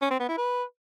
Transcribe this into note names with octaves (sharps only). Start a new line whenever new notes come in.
C#4
C4
B3
E4
B4